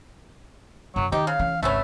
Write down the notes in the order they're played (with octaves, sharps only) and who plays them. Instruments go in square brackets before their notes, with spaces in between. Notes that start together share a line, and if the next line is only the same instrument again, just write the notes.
[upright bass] F#2 D3 [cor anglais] F#3
[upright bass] D#3 [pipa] D#4 [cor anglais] G4
[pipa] C#3 [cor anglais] F5
[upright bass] E3 C#4
[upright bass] G#1 C#2 [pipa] A3 B3 C#4 [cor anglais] E5